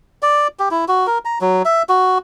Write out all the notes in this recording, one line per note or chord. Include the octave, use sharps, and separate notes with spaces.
D5
G4
E4
F#4
A#4
A#5
F#3
E5
F#4